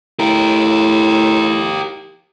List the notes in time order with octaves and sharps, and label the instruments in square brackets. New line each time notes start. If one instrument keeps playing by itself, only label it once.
[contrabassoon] A2 [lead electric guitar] G4 A#4